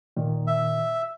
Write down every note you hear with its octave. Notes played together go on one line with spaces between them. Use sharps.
A#2 D#3
E5